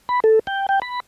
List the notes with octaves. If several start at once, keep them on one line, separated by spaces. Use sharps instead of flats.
B5
A4
G5
G5
B5